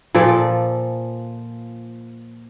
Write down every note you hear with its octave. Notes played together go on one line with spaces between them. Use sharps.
A#2 F3 A4 D5